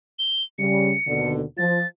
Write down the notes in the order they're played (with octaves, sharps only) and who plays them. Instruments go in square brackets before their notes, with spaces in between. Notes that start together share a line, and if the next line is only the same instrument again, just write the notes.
[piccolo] G7
[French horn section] C#3 G3 [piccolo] C#7
[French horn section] D#2 B2 D3
[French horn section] F3 [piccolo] A6